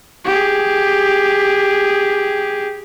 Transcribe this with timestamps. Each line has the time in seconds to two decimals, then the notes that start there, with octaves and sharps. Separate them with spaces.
0.24 G4 G#4